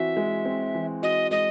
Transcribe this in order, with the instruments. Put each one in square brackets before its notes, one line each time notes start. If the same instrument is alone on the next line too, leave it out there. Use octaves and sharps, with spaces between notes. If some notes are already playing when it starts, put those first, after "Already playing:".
Already playing: [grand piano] E3 C4 F#4 [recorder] E5
[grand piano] G#3
C4
E3
[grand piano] F#4 [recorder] D#5
[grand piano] G#3 [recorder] D#5